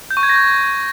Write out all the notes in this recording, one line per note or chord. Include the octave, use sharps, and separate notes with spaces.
G6
C#6
G#6
A#6
G6